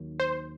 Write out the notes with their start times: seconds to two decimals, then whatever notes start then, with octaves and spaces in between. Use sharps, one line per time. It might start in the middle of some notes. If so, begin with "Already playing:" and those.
Already playing: D#2 D#3 F#3
0.20 C5